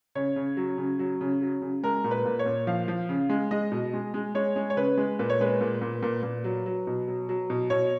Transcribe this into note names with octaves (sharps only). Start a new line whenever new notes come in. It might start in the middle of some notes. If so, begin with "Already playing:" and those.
C#3 C#5
C#3
F#3
C#3
F#3
C#3
F#3
C#3
G#3 A#4
A#2
B4
A#2
C#5
A#2
F3 F5
F3
C#3
G#3
G#3 D#5
B2
G#3
G#3
G#3 C#5
G#3
C#5
C#3 B4
G#3
A#2 B4
C#5
G#3 B4
A#2
A#2
A#2
A#2
F#3
F#3
B2
F#3
F#3
B2
B2 C#5